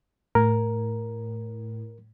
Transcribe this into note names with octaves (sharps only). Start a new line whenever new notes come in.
A2 A#4